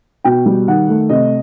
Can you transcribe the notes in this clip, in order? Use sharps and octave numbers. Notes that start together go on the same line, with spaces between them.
B2 G5
G3
D#3 F#5
A3
C3 D#5